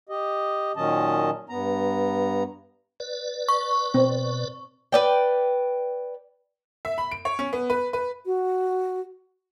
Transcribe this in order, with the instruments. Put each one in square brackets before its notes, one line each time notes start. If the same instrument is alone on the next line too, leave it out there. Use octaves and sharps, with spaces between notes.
[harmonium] G4 D#5
A#2 D#3 F#3 C#4 D#5 A5
G2 B3 A#5
[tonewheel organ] B4 D5
[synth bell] C#6
[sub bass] B2 [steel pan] C4
[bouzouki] B4 D5 G5
[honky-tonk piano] E5
B5
D7
C#5
C#4
B3
B4
B4
[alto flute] F#4